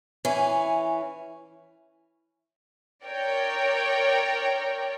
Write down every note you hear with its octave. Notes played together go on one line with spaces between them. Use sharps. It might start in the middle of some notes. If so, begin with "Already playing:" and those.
E3 C#4
A#4 C#5 D5 G5